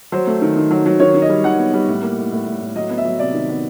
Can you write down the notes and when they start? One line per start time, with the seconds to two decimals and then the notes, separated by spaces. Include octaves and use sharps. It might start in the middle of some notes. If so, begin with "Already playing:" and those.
0.12 F#3 C5
0.27 A3
0.42 D#3
0.56 D#3
0.70 F#3
0.86 F#3
1.00 D#3 C#5
1.14 D#3
1.22 D#5
1.29 G3
1.44 D#3 F#5
1.59 B3
1.74 G3
1.88 A2
2.02 A#3
2.17 A2
2.32 A2
2.47 A2
2.60 A2
2.76 F#3 D#5
2.90 B3
2.98 E5
3.05 F#3
3.19 C3 D5
3.34 D#3
3.49 B3